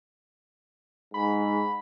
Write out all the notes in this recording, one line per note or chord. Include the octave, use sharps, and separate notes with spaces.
G#2 B5